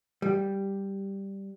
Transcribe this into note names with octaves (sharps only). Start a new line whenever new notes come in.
G3